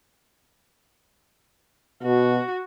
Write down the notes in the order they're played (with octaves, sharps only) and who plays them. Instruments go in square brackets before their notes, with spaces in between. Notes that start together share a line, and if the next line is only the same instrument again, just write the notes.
[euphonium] B2 [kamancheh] F#4